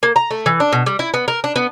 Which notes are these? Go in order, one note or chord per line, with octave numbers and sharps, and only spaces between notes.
A#3
A#5
A3
E3
D4
B2
G3
E4
B3
A#4
D4
B3